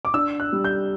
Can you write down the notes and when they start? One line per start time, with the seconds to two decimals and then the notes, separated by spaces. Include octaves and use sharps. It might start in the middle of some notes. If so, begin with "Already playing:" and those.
0.05 D6
0.14 D4 E6
0.40 F#6
0.53 G3
0.64 G6